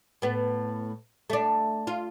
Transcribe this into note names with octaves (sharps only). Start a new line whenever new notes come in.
A2 B3
A3 D4
F4